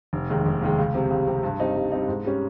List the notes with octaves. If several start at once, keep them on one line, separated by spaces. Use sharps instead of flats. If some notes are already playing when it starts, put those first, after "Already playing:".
F1
D#2 D#3 G#3
F1
D#2 D#3 G#3
C#2
C3 G3 C4
C#2
C3 G3 C4
G2
G3 C4 D#4
G2
G3 C4 D#4
G#2
G3 C#4